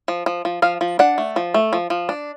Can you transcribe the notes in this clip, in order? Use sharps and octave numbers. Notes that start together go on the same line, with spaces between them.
F3
F3
F3
F3 F5
F3
D4 F#5
A3
F3
A3
F3
F3
D4